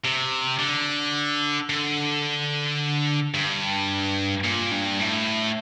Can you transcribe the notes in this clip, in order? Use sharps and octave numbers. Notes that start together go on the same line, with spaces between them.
C3
D3
D3
G2
A#2
G2
A2